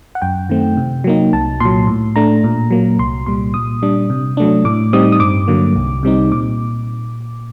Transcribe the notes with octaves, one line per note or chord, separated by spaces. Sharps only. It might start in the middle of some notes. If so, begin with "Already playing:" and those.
F#5
F#2 G5
D#3 A3 C4
C3
F#3 A#3 D#4
C2 A5
A#2 F#3 C6
A2
A3 D4 A#5
A#2
F#3 A#3
C2 C6
A#2 G3 C6
A#2 D#6
G3 D4
C3
F#3 A3 D4
A2 D6
G3 C4 D#4 D#6
D#6
G2 D6
D3 F#3 A#3
C2
C3 G3 C4 D#4
A#2 D6